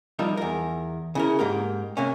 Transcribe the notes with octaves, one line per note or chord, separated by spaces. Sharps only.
F3 G3 D#4 F4 A#4 E5
E2 A#4
C#3 E4 A#4
G#2 A#3 G4 A#4
C3 A#3 C#4